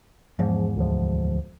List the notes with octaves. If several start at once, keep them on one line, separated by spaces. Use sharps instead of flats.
E2 G#2 F3
D2 F3